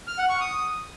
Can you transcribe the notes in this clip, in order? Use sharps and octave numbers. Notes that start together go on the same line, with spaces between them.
F6
F#5
C#6
D#6